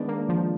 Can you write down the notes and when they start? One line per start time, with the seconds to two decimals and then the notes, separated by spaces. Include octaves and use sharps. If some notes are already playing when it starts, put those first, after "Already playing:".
Already playing: D#3 G#3 B3 D4
0.08 A#3
0.29 F3